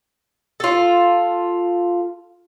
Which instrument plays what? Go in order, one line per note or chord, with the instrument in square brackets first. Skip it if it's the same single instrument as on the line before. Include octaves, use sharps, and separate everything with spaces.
[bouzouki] F4 A4